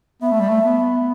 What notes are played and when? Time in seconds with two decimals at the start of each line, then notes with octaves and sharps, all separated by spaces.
0.22 B3 E5
0.31 A3
0.40 G3
0.49 A3
0.64 B3